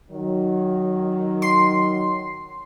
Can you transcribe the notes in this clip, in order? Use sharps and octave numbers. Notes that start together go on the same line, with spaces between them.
D#3 F#3
C6 C7